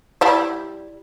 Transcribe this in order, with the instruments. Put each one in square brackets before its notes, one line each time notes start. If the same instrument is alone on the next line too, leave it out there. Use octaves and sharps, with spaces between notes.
[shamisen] G3 E4 D5